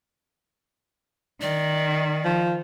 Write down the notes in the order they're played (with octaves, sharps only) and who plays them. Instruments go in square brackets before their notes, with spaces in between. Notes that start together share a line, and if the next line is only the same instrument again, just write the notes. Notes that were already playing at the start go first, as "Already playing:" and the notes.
[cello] D#3 [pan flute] D5
[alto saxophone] F3